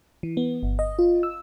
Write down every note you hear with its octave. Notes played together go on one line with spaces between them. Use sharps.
E3
B3
G1
D#5
F4
E6